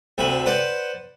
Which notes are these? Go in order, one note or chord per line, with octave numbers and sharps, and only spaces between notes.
D2 C3 A3 B5
B4 C5 D5 F#5